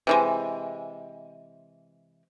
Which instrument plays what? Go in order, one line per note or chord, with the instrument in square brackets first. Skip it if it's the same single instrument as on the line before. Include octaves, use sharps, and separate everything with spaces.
[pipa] C3 E3 G#3